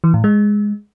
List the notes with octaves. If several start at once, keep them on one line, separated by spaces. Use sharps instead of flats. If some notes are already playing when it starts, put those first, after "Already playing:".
E3
A2
G#3